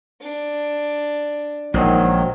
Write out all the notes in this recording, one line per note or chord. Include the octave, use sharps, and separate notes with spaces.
D4
A#1 G#2 D#3 F#3 C5 D#5